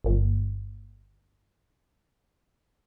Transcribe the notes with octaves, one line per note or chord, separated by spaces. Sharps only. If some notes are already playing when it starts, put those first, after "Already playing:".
G1 A#2